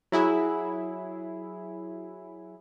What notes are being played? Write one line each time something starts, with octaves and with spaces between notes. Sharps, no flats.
F#3 E4 G#4